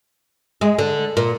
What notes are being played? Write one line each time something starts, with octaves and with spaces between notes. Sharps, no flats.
G#3
D3
A#2